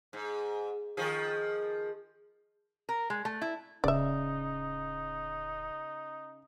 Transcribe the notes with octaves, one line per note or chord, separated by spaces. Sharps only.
G#2
D#3 F3 G#4
A#4
G#3
A3
E4
D1 C#3 D#4 D5 E5